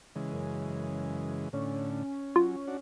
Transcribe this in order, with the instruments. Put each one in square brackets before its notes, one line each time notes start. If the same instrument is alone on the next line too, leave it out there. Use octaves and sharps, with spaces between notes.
[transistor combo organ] C#3 E3 G#3
[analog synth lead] F#2
[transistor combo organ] A2 D3 [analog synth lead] C#4
[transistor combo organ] F#3 [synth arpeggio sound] F4
[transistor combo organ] D4 F#4